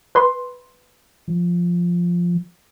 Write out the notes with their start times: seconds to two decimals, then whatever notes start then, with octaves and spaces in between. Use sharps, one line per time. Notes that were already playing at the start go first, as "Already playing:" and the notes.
0.15 B4 C6
1.28 F3